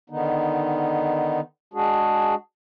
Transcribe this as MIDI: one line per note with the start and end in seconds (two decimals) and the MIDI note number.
0.10 1.40 50
0.10 1.40 51
0.10 1.40 59
0.10 1.40 63
1.74 2.35 56
1.74 2.35 62
1.74 2.35 66
1.74 2.35 68